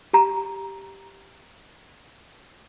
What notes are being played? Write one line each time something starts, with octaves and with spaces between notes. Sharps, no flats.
G4 A#5